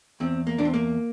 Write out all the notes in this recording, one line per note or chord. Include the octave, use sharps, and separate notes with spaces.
E2 C4
A#3
E2 D4
C4
A#3